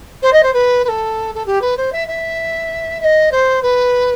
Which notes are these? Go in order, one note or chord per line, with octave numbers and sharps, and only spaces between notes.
C5
D#5
C5
B4
B4
A4
A4
G4
B4
C5
E5
E5
E5
D#5
C5
B4